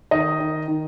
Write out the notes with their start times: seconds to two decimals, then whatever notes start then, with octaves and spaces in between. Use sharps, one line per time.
0.11 D#3 D#5
0.40 D#3
0.68 D#3